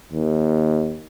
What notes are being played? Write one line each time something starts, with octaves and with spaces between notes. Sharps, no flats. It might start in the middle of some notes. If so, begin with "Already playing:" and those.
D#2